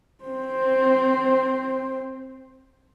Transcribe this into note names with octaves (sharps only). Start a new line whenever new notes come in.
C4 C5